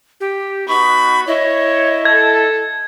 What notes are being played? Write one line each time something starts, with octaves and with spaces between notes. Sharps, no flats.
G4
B3 D#4 F#4 B5 C#6
E4 C#5 D#5
A4 G#6